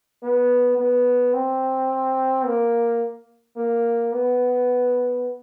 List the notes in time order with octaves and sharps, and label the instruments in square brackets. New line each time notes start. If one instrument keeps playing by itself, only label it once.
[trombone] B3
B3
C4
A#3
A#3
B3